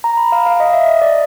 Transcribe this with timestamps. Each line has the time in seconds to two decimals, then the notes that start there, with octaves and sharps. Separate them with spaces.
0.04 A#5
0.17 B5
0.32 F5
0.46 F5
0.60 D#5
0.73 E5
0.88 D#5
1.02 D5